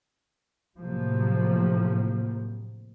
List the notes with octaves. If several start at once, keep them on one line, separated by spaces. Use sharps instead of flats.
A2 C3 F3 F#3 A#3